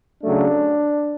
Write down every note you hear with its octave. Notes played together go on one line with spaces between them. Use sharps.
C#3 F#3 A3 D4